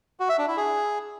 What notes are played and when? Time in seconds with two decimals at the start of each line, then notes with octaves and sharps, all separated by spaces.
0.20 F#4
0.29 E5
0.38 D4
0.48 E4
0.57 G#4